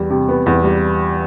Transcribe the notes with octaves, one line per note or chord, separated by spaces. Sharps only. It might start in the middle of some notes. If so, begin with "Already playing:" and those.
Already playing: E2 G3
C3
B3
E2
G3